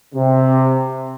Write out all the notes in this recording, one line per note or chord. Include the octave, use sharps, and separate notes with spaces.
C3